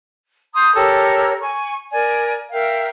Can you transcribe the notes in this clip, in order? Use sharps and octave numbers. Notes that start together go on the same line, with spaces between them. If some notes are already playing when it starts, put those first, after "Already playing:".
A#5 C6 D#6 G6
G4 A4 A#4 C#5
G#5 C#6
A#4 D5 G#5
A#4 E5 F5 G5